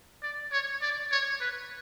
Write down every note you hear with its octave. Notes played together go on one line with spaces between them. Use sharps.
D5
C#5
D5
C#5
B4